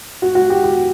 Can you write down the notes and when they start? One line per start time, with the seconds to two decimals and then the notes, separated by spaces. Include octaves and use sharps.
0.22 F#4
0.35 F#4
0.50 G4
0.64 G4